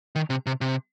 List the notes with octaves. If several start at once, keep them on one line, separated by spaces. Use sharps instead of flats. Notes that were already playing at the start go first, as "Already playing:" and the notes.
D#3
C3
C3
C3